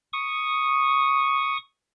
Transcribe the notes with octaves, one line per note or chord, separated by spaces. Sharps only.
C#6 D#6